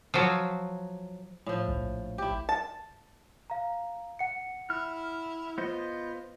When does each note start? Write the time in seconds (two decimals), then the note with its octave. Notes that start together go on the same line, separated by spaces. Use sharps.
0.14 F3 F#3
1.46 A2 F3
1.68 A#1
2.18 E4 G4
2.49 A5
3.50 F5 A#5
4.19 F#5 C#7
4.70 E4 F6
5.58 B3 F4 C5 D#5